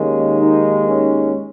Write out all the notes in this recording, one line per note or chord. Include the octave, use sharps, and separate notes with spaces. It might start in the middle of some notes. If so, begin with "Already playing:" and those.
Already playing: D#2 D#3 G#3 C#4
D#4
C#4